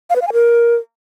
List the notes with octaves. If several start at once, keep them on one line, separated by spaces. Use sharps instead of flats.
F5
B4
F5
G#5
A#4